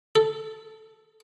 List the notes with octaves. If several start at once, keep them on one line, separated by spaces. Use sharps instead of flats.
A4